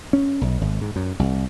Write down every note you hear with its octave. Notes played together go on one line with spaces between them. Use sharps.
C#4
B1
G#1
G#2
F#2
C2